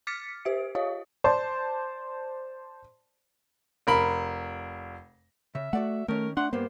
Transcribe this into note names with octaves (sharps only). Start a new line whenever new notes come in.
D6 F6 A6 B6 C#7
G4 C5 E5 D7
F4 G4 C#5 D#5 F5 D#6
C5 D5 A5 C6
F1 A#4 B5
C#3 E5
A3 F#4 D5 F#5
D#3 A3 C#4 A#4
A3 D4 F#5 C6
G2 A#3 B3 C5